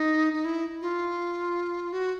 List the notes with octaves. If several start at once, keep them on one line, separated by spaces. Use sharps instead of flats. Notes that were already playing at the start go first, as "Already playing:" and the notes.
Already playing: D#4
D#4
E4
F4
F#4